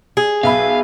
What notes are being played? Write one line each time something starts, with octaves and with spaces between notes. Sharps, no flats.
G#4
B1 E5 F5 B5